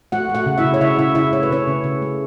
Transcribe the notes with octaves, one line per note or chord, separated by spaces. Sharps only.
A3 F#4 F#5
A3
F#4 F#5
C#3
E4 E5
C#3
C#5
C#3 E4 E5
C#3 E4 E5
C#3 E4 E5
A3 C#5
B4
C#3 C#4 C#5
C#3
C#3
A3